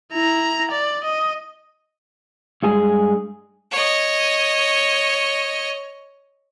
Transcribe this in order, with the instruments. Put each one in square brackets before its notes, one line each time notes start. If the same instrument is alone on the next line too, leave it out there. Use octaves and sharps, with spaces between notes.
[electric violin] E4 A#5
D5
D#5
[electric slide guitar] G2 G#3 G#4
[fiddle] C#5 D#5